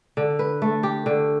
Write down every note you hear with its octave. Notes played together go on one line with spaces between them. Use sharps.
D3
B4
A3
G4
D3